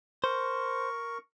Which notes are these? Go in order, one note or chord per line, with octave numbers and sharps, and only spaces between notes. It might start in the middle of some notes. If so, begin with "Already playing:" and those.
A#4 C5 C#6